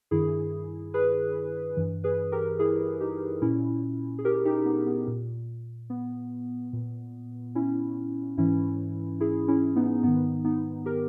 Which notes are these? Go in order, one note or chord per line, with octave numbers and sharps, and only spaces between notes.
G2 D#3 E4 G#4
G#4 B4
G2 E3
G#4 B4
G4 A#4
E4 G#4
D#4 G4
A#2 C#4 E4
G#4
G4 A#4
D#4 G4
B3 D#4
B3
A#2
B3
A#2
C#4 E4
G#2 E3 C#4 E4
E4 G#4
C#4 E4
B3 D#4
G#2 D#3 B3 D#4
B3 D#4
G4 A#4